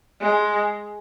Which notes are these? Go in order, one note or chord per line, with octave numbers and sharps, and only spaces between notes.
G#3